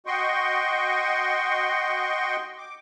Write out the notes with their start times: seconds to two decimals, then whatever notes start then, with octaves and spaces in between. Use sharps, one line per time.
0.06 F#4 D#5 G5 C6 C#6
2.58 D6